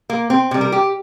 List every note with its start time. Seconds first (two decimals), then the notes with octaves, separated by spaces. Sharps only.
0.10 A#3
0.30 C4
0.51 C3 G3
0.61 A#4
0.72 G4